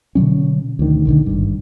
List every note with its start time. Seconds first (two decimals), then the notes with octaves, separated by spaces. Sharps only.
0.15 B2 D3 F#3 C#4
0.79 D2 D#3
1.07 B1 D3 D#3
1.26 G#1 G2